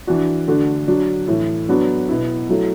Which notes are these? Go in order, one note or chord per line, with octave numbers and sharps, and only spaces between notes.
E3 D4 F#4
D3 A3 D4 F#4
F#3 D4 F#4
A2 E3 A3 E4
F#3 B3 D4 F#4
B2 B3 E4
F#3 A3 E4